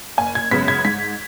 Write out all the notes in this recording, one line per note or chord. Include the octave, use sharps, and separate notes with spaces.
F#1 G#5
G#6
F#2 C#3 G#3 B3 B6
G#6
G#2 B6